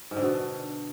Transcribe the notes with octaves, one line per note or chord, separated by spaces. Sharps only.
G#2
D3
B2